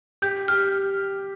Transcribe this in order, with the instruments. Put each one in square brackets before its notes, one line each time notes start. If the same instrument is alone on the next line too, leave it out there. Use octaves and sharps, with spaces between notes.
[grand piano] G4 [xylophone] G6
[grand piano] G4 [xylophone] F6